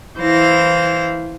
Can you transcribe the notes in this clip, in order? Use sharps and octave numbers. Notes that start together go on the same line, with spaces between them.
E3 E4 C5 F5 A#6